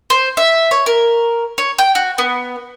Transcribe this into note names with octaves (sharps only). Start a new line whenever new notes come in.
C5
E5
C#5
A#4
C#5
G5
F#4
B3